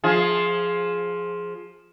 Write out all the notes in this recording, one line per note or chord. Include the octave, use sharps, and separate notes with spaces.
F3 F4 G#4